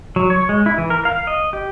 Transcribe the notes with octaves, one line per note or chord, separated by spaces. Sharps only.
F#3
C#5
G#3
E4
E3
A#4
F5
D#5
G4